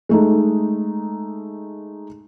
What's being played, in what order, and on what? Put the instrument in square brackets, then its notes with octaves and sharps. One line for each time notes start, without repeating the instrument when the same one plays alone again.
[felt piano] G#3 A3 D#4